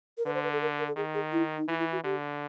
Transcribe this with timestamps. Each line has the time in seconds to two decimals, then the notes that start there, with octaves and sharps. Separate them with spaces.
0.18 A#4
0.26 D3 B4
0.34 C5
0.44 B4
0.53 A4
0.62 A#4
0.79 A#4
0.87 A4
0.96 D#3 G#4
1.14 G#4
1.32 E4
1.58 D#4
1.68 E3 E4
1.79 E4
1.92 F#4
2.04 D3 G4